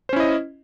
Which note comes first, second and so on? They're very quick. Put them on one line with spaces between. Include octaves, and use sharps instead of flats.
C5 C#4 E4 D#5